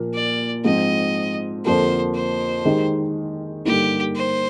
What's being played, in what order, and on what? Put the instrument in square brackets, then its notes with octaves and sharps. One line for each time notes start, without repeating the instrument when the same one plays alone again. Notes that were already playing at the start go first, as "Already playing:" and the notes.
Already playing: [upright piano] A#2 F3 A#3
[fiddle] D5
[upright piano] G#2 F3 C4 [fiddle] D#5
[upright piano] F2 D3 F3 A#3 [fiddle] C5
[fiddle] C5
[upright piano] D#3 G#3 D#4 G4
[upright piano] G2 D3 G3 A#3 D#4 [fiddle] G4
[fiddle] C5